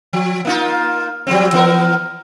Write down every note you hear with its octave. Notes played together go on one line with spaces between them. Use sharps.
F3
A#3 D#4 F4
F3 G3 C4
E3 B3 A#4